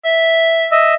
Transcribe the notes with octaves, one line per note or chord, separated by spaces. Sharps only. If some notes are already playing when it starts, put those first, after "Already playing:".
E5
D#5 E5 E6